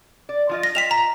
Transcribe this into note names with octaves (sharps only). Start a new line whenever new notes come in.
D5
F3 F4 D#5
A#6
F4 D#5 G5 B6 E7 F7
A#5